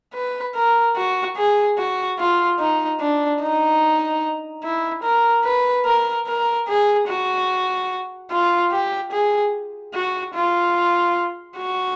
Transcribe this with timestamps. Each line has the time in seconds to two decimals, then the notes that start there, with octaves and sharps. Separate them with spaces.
0.14 B4
0.55 A#4
0.96 F#4
1.37 G#4
1.78 F#4
2.19 F4
2.59 D#4
3.00 D4
3.41 D#4
4.63 E4
5.04 A#4
5.45 B4
5.86 A#4
6.27 A#4
6.68 G#4
7.08 F#4
8.31 F4
8.72 G4
9.12 G#4
9.94 F#4
10.34 F4
11.57 F#4